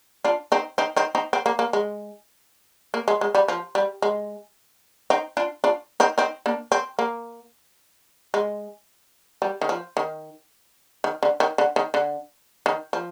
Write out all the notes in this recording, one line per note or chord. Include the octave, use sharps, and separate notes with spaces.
D4 F4
C4 D#4
C4 D#4
C4 D#4
C4 D#4
C4
A#3
A#3
G#3
A#3
G#3
G#3
G3
F3
G3
G#3
C4 D#4
D4 F4
D4 F4
C4 D#4
C4 D#4
A#3 D4
C4
A#3
G#3
G3
D#3
F3
D#3
D#3
D3
D#3
D3
D#3
D3
D#3
F3